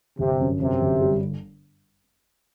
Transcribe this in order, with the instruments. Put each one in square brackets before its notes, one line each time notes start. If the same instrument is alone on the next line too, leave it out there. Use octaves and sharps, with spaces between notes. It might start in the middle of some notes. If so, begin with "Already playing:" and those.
[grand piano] G1 [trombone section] C3
[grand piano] F#2
[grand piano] F#2 [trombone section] C3
[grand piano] G1
G3